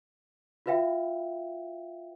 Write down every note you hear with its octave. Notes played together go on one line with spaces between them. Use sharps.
F4 F#4 B4 E5 F5 G5